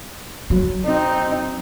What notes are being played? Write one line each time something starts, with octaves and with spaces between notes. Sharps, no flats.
F#3
C4 D#4